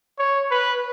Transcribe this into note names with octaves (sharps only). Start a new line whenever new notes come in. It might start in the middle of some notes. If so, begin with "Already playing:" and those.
C#5
B4